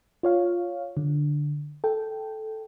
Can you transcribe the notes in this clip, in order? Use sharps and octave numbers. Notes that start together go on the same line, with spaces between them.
F4 C#5 F5
D3
A4 G5